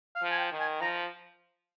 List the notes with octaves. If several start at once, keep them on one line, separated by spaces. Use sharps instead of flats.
F5
F3
G#5
G5
D#3
G#5
F3 A#5